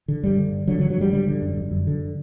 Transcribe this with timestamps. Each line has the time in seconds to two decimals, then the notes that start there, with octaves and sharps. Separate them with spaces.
0.08 D3
0.23 G2 G3
0.38 D3
0.53 G2
0.67 D3 F#3
0.79 F#3
0.83 D3
0.90 F#3
0.97 G2 G3
1.13 D3 G3
1.27 D3
1.42 F#2
1.57 F#2
1.72 F#2
1.87 D3